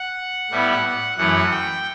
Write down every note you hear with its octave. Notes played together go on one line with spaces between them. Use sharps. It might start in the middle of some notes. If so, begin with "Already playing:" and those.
Already playing: F#5
A2 G3 B3 E4
F#2 E3 A3 F#5
G5